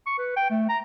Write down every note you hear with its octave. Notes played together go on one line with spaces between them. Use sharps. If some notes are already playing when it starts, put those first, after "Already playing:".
C#6
B4
G5
A3
A#5